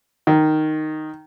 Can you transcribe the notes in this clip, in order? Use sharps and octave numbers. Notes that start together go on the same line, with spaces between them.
D#3